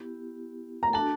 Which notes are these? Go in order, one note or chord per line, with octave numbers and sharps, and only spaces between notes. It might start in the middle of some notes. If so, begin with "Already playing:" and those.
Already playing: B3 E4 G4
A#5
D4 F#4 A4 A5